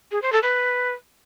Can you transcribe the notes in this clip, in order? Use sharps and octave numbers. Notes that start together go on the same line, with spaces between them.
G#4
C5
A4
B4